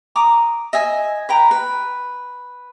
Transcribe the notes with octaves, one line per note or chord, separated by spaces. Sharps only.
A#5 D6 D#6
D#5 E5 G#5
B4 G5 A#5
B4